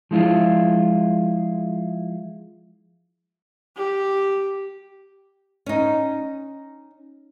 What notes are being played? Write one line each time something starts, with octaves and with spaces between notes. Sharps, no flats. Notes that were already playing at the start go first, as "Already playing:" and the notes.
F3 G#3 E4 F4
G4
C#4 D#4